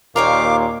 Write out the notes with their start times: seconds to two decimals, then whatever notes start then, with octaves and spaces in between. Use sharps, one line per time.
0.16 D#2 A#2 A#4 C5 C#5 F5 D6